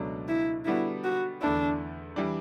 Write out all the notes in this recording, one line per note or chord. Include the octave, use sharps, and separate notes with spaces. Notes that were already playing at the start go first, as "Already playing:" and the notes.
Already playing: C#2 B2 F#3 A3 D4
E4
D3 G3 B3 D4 E4 F#4
F#4
E2 D3 A3 D4 E4
E3 G3 D4